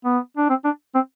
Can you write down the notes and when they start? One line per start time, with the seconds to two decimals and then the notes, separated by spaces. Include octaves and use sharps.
0.04 B3
0.37 D4
0.49 C4
0.64 D4
0.94 C4